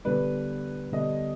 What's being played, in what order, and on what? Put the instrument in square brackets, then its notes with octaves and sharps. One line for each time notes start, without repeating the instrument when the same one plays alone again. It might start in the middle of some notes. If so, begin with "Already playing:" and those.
[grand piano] D3 G3 B3 D4 [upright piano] B4
[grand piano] D3 G3 B3 D4 [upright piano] D#5